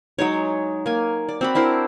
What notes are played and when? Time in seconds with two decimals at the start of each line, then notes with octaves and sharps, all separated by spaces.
0.19 F#3 G#3 D#4 C#5
0.86 A#3 G#5
1.29 D5
1.41 C4 F#4 B5
1.55 D4 E4 A#4 C5